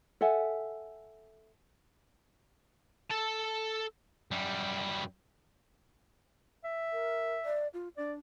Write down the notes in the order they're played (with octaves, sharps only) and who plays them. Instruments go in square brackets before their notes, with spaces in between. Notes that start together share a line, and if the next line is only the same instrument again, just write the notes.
[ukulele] A4 E5 F#5 G#5
[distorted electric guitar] A4 A5
F#2 G3
[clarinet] E5
[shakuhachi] A#4
D5
F4
[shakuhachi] D4 [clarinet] D5